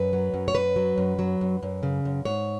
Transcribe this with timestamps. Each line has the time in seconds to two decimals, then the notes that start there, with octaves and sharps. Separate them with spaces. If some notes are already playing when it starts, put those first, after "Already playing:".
Already playing: F#2 B4
0.13 F#3
0.34 F#2
0.48 C#5
0.55 F#2 B4
0.76 F#3
0.98 F#2
1.19 F#3
1.41 F#2
1.63 F#2
1.83 C#3
2.05 F#2
2.25 G#2 C#5